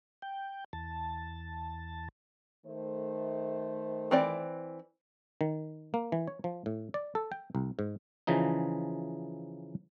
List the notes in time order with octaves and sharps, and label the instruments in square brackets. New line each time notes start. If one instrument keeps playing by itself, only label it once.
[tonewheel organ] G5
E2 A5
[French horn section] D#3 A3 C5
[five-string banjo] E3 C4 D5
[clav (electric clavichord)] D#3
A#3
E3
C#5
F3
A2
D5
A4
G5
C2
G#2
C#3 E3 F3 D#4